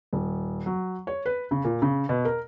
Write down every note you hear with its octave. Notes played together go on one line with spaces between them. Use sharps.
D#1
F#3
C#5
B4
C#3
A#2
C#3
B2
A#4